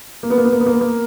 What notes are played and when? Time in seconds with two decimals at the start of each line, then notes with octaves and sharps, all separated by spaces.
0.23 A#3
0.30 B3
0.38 A#3
0.45 B3
0.52 A#3
0.60 B3
0.66 A#3
0.73 B3
0.81 A#3